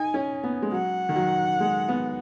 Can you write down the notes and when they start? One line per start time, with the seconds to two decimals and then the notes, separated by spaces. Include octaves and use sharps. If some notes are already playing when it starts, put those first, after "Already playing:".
Already playing: D#4 G#5
0.14 C#4
0.44 B3
0.62 G#3
0.72 F#3 F#5
1.09 D#3
1.16 F#3
1.60 G#3
1.88 B3